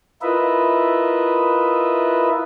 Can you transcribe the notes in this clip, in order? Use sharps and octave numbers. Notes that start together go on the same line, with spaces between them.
E4 F4 A#4 B4 D#5 E5